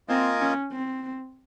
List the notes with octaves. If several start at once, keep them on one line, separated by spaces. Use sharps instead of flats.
A#3 C4 F4 A#4 D#5 G#5
C#4
C4